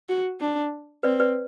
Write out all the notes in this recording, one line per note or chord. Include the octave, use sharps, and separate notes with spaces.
F#4
D4
C4 B4 D5
B4 D5